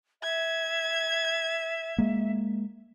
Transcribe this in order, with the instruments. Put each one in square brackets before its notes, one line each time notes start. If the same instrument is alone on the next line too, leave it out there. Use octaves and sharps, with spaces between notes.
[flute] E5 [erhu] G#6
[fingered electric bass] G#3 A#3